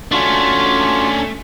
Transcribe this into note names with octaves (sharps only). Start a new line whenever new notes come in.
A3 C#4 D4 F4 F#4